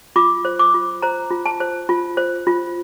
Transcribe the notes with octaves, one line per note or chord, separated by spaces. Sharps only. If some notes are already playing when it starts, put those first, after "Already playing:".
F4 D6
C5
D6
F4
C5 A#5
F4
A5
C5
F4
C5
F4